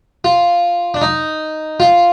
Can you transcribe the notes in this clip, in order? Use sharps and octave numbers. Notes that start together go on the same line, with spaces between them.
F4
D4
D#4
F4